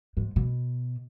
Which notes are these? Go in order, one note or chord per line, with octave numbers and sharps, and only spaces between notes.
G#2
B2